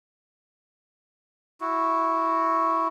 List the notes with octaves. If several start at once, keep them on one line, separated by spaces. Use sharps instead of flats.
E4 F#4